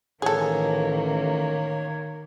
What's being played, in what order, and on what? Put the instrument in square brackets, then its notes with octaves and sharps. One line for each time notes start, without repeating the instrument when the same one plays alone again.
[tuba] A1 [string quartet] D#3 A#3 [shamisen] G#4 A4 [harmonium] C#5